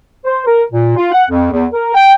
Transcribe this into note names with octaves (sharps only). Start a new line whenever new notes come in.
C5
A#4
A#2
F4
F#5
F2
E2
A#4
G5